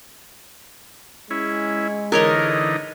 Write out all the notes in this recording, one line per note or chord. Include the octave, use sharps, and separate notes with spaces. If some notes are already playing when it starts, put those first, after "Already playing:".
G#3 C#4 E4
D3 E3 D#4 A#4 C#5 D#5